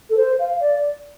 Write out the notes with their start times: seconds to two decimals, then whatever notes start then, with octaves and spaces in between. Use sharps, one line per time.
0.09 A4
0.16 C5
0.39 F5
0.60 D5